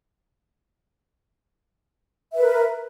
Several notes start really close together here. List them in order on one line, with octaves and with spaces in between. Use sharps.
E5 B4 A#4